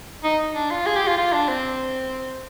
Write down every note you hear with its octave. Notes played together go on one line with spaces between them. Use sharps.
D#4
D4
F4
G#4
G4
F4
F4
D4
C4